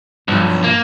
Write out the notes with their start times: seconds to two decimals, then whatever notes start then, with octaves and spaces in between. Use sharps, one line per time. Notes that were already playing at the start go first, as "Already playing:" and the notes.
0.28 B1 G2 F3
0.64 A#3